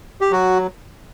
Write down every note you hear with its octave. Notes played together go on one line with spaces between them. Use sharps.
G4
F#3 F#4